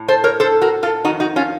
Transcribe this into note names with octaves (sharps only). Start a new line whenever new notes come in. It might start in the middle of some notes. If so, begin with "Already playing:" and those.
Already playing: A2
A4 C5
A#4 C#5
A4 C5
F#4 A#4
F4 A4
F2 D#3 D#4 F#4
D#4 F#4
C#4 F4